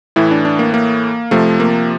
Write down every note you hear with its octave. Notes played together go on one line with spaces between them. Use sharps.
A2 E3 E4
D4
D4
A#3
A#3
C3 F3 A3
A#3